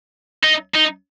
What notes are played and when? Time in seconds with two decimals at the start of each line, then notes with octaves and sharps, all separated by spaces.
0.43 D#4
0.74 D#4